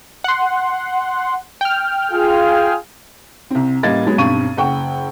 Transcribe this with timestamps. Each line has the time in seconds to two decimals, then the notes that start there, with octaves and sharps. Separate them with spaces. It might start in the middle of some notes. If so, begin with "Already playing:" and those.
0.24 F#5 C6
1.61 G5 F6
2.12 F4 G#4
3.50 C2 C4
3.83 A1 G3 A#3 D#5 G#6 A6
4.06 F#3 G#3 B3
4.18 B1 G2 C4 C#6 D#7
4.57 F#1 F#5 G5 C#6